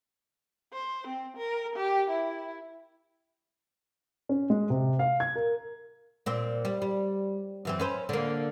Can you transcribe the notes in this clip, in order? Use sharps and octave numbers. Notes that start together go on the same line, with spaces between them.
C5
C4
A#4
G4
E4
C#4
G#3
C3
F5
G#6
A#4
A#2 C4
G3
G3
F#2 E3 C4
C#4 B4 C5
D3 A#3